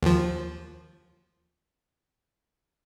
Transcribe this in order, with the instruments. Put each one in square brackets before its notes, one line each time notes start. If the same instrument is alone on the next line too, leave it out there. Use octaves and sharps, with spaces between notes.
[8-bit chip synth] D#2 F3